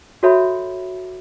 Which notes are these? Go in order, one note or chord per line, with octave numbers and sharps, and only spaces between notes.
F#4 A4 C#5 E5 B5